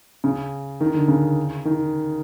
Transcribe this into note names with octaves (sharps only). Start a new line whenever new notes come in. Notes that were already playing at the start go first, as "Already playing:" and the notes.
C#3
D#3
D3
C#3
D#3